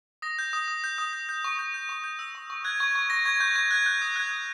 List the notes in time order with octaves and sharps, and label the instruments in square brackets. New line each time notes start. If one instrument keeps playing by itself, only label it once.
[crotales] D#6 A#6
G6
D#6
D#6
G6
D#6
G6
G6
C#6
G6
G6
C#6
G6
E6
C#6
C#6
F#6 G#6
C#6 G#6
C#6
C#6 A#6
C#6 G#6
C#6 G6
C#6 G#6
F#6 G#6
F#6 G6
D#6
F#6 G#6
D#6